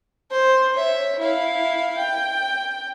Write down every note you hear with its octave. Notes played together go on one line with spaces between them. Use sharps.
C5
C#5 E5
E4 F5
G5